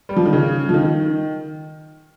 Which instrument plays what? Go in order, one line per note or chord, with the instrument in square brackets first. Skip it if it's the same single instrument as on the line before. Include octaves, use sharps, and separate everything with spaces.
[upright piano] G3
F3
D#3
C#3
F3
D#3